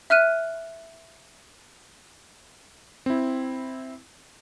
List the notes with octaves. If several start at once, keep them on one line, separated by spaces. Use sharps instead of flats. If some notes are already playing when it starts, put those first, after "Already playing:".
E5 F6 F#6 D#7
C4 E4